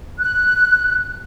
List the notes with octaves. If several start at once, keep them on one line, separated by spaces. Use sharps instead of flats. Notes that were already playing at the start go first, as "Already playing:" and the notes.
F#6